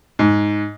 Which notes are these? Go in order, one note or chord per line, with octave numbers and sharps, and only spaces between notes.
G#2